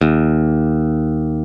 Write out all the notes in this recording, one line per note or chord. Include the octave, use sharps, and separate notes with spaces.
D#2